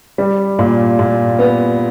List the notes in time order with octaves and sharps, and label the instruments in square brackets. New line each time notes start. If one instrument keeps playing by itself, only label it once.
[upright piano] G3
A#2
A#2
B3